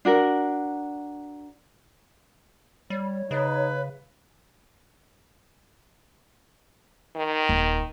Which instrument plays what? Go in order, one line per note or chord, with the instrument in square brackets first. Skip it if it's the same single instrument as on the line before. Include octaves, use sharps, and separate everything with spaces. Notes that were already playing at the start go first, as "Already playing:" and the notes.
[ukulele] D4 F#4 A#4
[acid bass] G3 [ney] C#5
[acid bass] C#3 [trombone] D#4 [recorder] B4
[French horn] D#3
[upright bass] D#1